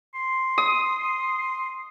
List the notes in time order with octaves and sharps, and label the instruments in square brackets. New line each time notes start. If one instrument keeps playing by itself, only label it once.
[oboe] C6
[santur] D#6